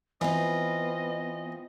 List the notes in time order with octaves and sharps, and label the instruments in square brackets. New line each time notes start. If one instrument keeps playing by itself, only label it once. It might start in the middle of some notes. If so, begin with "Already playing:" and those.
[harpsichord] E3 [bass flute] B3 [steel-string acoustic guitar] C4 F4 [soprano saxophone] D#5